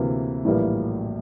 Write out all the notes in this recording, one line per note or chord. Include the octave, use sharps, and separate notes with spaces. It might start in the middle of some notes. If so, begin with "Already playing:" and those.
Already playing: D2 C3 E3 A#3
A#1 A2 E3 G3 A#3